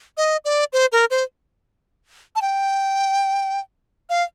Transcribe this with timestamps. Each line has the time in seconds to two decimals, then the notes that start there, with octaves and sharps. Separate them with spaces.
0.17 D#5
0.45 D5
0.73 C5
0.92 A#4
1.10 C5
2.36 A5
2.42 G5
4.10 F5